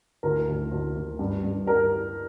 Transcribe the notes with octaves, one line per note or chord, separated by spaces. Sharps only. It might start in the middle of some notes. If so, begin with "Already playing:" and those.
D2 A#4
D2
D2
D2
G2
G2
G3 A#4